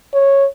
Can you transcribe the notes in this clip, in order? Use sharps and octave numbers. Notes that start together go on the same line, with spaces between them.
C#5